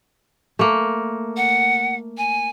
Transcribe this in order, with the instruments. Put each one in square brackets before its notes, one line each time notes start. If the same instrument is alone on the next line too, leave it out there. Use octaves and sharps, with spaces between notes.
[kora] A3 A#3
[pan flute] F#5
G#5